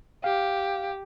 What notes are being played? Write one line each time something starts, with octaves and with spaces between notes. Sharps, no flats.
G4 F5